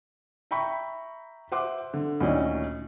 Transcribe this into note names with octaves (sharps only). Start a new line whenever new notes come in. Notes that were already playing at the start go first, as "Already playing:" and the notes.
E5 G5 A#5 B5 C#6
C5 E5 F#5 C6 D6
D3
D2 A#2 D#3 C#4 D5 D#5